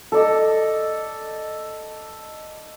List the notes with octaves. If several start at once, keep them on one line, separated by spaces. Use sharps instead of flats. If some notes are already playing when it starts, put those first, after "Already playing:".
A4 D5 D#5